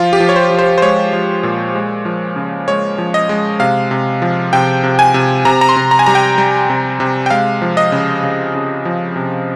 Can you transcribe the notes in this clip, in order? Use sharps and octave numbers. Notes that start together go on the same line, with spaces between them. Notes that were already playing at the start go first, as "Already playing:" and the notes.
Already playing: F3 F4
G4
F3
C#5
C5
F3
C5
C5
G#3 C#5
F3
A#2
G#3
F3
C#3
G#3 C#5
F3
D#5
G#3
C3 F5
C3
F3
C3 G5
C3
G#5
C3
C3 A#5
A#5
C6
C3
A#5
G#5
G3 A#5
G5
G3
C3
C3
G5
G#3 F5
F3
D#5
C#3
C#3
C#3
F3
C3